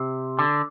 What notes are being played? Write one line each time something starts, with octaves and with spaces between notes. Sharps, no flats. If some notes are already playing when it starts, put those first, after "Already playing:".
Already playing: C3
D3